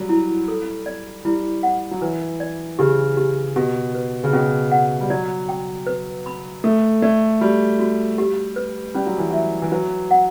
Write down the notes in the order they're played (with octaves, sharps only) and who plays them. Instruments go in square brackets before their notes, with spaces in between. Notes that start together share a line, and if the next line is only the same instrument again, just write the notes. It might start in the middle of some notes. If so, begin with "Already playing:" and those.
Already playing: [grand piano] F#3 G3
[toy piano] E4
A4
D5
[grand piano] G3 [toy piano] E4
[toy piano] F#5
[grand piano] F#3
[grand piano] E3 [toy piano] B4
[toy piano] D5
[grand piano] C#3 [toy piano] G4
[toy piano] G4
[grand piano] B2 [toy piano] G4
[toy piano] B4
[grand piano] C#3
[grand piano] B2 [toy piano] C#4
[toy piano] F#5
[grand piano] G3
[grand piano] F#3 [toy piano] D5
[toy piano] G5
B4
B5
[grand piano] A3 [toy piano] A4
[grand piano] A3 [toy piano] D5
[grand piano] G3 [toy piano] F#4
[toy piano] F#4
G4
B4
[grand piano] G3 [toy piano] C#4
[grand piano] F#3
E3
[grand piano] F#3 [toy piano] E5
[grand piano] E3
[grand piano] F#3 [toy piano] B4
[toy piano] F#5